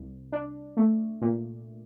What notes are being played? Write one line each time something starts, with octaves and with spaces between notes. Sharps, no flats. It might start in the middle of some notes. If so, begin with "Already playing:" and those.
Already playing: C2
D4
A3
A#2